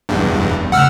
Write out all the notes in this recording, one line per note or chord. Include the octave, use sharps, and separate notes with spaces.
B1 E2 G2
E1 F#2
C#3 A3 F#5 E6 F6